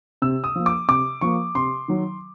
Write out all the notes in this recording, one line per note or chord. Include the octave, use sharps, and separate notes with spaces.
C3 E6
D#6
F3 A#3
D6
C3 D6
F3 A#3 C#6
C3 C6
D#3 F#3